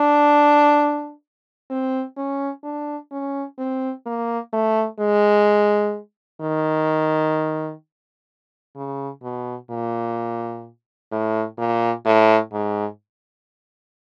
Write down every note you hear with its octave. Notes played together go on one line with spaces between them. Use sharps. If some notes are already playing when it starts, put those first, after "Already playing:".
Already playing: D4
C4
C#4
D4
C#4
C4
A#3
A3
G#3
D#3
C#3
B2
A#2
A2
A#2
A2
G#2